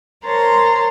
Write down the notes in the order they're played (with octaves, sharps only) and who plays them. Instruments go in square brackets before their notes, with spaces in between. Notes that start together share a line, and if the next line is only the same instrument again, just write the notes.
[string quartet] A#4 C5 C#5 A5 A#5 C6